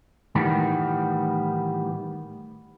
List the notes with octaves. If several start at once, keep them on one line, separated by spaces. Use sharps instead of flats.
A2 D#3 E3 G3 B3